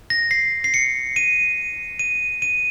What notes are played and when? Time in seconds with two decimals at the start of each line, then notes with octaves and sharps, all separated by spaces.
0.10 A#6
0.31 C7
0.64 C7
0.74 C#7
1.16 D#7
1.99 D#7
2.42 D#7